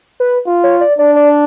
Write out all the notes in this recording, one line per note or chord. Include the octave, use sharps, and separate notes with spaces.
B4
F4
C#5
D5
D4 D5
D5